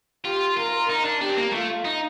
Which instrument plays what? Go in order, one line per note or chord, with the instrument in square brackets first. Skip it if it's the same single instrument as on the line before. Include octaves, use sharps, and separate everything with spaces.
[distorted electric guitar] F4 [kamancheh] G4
[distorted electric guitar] F4 [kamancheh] A#4
[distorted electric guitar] D#4
D4
[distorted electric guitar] D4 [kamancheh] G4
[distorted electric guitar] C4
A#3
[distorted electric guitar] A3 [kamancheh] F4
[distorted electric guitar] D#4